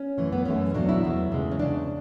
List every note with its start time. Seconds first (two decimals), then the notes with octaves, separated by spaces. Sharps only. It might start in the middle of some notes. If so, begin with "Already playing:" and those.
Already playing: C#4
0.18 F#2 E3 A3
0.32 B3
0.45 F#2 E3 A3 C#4
0.74 E2 B2 F#3 A3 D4
0.89 E4
1.03 E2 B2 F#3 A3
1.31 E2 C#3 G#3
1.52 C#4
1.59 E2 C#3 G#3 D4